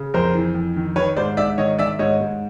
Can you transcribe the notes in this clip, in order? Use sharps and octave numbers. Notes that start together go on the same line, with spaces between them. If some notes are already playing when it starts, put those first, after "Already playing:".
Already playing: C#3
F2 A#4 C5
E3
F2
D#3
D#3 B4 C#5
G#2 C5 D5
G#2 D5 E5
D#3 C#5 D#5
D#3 D5 E5
G#2 C#5 D#5
G#2